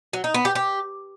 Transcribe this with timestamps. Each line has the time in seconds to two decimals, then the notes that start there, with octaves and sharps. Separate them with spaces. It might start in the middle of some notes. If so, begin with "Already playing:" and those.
0.13 F#3
0.24 D#4
0.34 B3
0.45 G4
0.55 G4